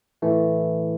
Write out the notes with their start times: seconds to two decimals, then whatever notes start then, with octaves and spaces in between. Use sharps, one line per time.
0.22 A2 E3 A3